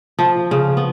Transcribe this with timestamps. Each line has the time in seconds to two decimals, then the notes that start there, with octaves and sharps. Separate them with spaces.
0.19 F3
0.51 C#3
0.77 B3